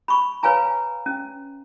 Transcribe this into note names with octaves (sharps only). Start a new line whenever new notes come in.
B5 C#6
B4 C#5 F5 G#5 A#5
C#4